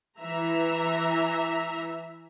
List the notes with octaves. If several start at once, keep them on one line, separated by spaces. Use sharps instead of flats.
E3 E5 A#5